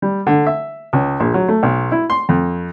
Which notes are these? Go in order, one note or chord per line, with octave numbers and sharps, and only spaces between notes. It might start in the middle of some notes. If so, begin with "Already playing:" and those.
G3
D3
E5
C#2
A#1
F#3
A3
B1
E4
C6
F2